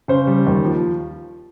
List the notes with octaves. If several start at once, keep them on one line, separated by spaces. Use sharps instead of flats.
C#3 C5
G3
D#2
F3